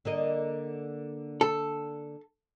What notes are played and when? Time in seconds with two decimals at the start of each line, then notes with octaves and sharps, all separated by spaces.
0.05 D3 A#3 D#5
1.41 A4